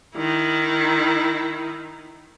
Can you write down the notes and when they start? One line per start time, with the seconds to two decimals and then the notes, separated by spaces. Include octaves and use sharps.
0.16 D#3 E4